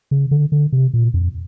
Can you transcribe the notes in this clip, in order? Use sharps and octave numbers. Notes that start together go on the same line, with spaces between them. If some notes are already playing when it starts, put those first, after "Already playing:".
C#3
D3
D3
C3
A#2
F2